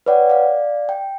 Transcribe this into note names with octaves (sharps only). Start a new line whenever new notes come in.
B4 C#5 D5 F#5 G5
D5 F5
G5